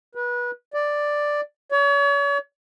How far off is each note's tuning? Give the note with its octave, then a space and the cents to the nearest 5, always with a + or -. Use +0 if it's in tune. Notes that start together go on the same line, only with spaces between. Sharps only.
B4 -25
D5 +5
C#5 +40